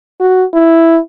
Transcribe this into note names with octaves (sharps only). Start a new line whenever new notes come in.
F#4
E4